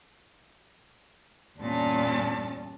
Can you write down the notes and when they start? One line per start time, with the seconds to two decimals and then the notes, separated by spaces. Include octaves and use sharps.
1.58 E2 G2 A#2 C#4 D4 A5